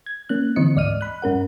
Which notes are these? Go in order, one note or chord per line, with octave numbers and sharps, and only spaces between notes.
G#6
A#3 C#4 F#6
D3 E3 C4 D#5 C#7
D2 G#2 D5 D#5 F6 D#7
B5 F#6
G2 C#4 A#4 F#5